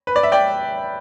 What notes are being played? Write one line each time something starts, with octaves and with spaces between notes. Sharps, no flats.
B4
D5
E5
D5 G5